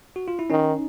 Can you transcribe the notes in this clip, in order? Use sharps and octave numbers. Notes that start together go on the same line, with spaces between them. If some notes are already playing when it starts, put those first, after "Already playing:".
F#4
F4
E4
D#3 C#4 D#4